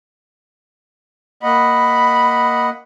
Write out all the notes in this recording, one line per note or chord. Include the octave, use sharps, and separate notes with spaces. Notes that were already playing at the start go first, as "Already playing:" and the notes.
A#3 D#5 F#5 B5